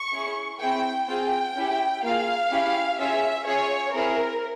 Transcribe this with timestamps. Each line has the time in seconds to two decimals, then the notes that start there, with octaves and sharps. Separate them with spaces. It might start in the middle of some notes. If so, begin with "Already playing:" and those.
Already playing: C#6
0.12 C#4 E4 G#4
0.60 C4 E4 G#4 G5
1.08 C4 F4 G#4 G5
1.56 C#4 E4 G4
2.03 A#3 F4 G#4 F5
2.51 C#4 E4 G4
2.98 C#4 F4 G#4 E5
3.46 C#4 F4 G#4 C#5
3.94 C4 E4 G#4 A#4